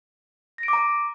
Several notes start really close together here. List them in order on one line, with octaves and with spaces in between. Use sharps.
A#6 D7 D6 A#5